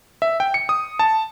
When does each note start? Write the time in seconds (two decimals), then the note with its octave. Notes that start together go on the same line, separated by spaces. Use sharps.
0.22 E5
0.40 G5
0.54 C#7
0.69 D#6
0.99 A5